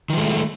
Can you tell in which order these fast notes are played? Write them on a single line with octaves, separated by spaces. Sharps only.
D#3 F3 G#3 A3